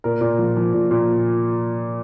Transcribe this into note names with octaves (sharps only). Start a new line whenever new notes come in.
A#2 A#4
A#2
F3
F3
A#2
A#2